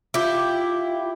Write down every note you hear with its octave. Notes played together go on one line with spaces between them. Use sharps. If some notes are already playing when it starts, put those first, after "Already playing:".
E4 F4 G4